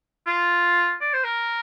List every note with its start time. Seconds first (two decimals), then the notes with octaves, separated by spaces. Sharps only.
0.27 F4
1.01 D5
1.13 C5
1.24 A#4